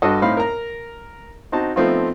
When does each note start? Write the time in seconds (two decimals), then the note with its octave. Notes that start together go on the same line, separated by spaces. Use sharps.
0.02 G2 F#4 A4 D#5
0.22 A2 C4 D#4 F5 B5 C6
0.37 A#4 A#5
1.52 C4 D#4 F#4 A5
1.76 F3 A3 B3 C4 D#4 F4